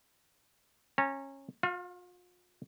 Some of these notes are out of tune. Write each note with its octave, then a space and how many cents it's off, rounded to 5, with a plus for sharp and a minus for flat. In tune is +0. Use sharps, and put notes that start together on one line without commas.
C#4 -20 A#5 -35
F4 +40 F5 +0